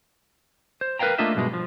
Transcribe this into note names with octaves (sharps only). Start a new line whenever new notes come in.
C5
A#4 B4 D5 F5 G5 A#5
A3 A#3 D4 F4 D#5 E5
B1 G2 B2 G#3
F3